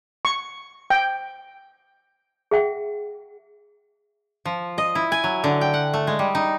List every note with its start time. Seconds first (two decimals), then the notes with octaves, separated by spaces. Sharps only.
0.25 C#6
0.90 G5
2.51 G#4 E5 F#5 G5
4.46 F3
4.78 D#5
4.95 E4
5.12 G#5
5.24 F#3
5.44 D3
5.61 G5
5.74 F#5
5.94 A3
6.07 G#3
6.19 G3
6.35 D#4